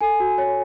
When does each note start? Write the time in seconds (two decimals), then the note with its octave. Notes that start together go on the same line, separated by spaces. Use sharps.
0.01 A4 G#5
0.20 F#4
0.38 C#5